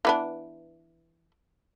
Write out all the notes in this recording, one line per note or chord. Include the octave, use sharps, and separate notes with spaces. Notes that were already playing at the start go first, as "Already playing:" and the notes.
E3 B3 D4